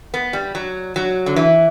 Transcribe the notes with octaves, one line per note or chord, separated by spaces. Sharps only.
B3
G3
F#3
F#3
D3
E3